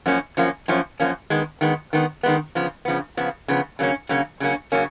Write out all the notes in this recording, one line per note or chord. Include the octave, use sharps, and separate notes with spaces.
F#2 F3 A#3 C#4
F#2 F3 A#3 C#4
F#2 F3 A#3 C#4
F#2 F3 A#3 C#4
D#3 G#3 B3
D#3 G#3 B3
D#3 G#3 B3
D#3 G#3 B3
C#3 F3 B3
C#3 F3 B3
C#3 F3 B3
C#3 F3 B3
C#3 F#3 A#3 C#4
C#3 F#3 A#3 C#4
C#3 F#3 A#3 C#4
C#3 F#3 A#3 C#4